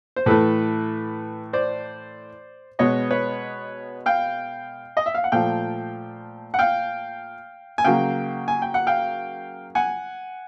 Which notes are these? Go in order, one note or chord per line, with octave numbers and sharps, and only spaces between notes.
C5
A2 E3 A3 A4 B4
C5 D5
B2 G#3 B3 C#5 D#5
B4 C#5
F5 G5
D#5
E5
F5
F#5
A#2 F3 A3 F5 G5
F#5
F5 G5
G#5
C#3 F#3 A#3 F5 G5
G#5
G5
F#5
F5 G5
F#5 G#5